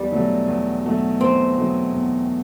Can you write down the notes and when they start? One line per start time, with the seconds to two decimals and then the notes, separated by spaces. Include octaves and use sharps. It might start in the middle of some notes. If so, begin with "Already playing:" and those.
Already playing: E2 G3
0.11 B2 F#3 A3 D#4
0.47 E2
0.84 B2 F#3 A3 D#4
1.21 E2 C4
1.57 B2 F#3 A3 D#4
1.93 E2